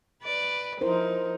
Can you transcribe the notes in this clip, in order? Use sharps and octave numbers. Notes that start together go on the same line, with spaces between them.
B4 D5
F3 D#4 E4 A#4 C5